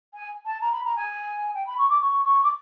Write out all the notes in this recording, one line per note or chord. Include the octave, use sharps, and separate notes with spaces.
G#5
A5
A#5
B5
A#5
G#5
G5
B5
C#6
D6
C#6
C#6
D6